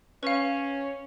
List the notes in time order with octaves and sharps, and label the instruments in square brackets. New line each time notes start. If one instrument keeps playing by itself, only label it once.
[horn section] C#4 [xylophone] B4 F5